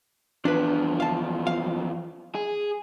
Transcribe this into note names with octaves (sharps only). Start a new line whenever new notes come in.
E2 F3 D4 B4
F5 A5
F5
G#4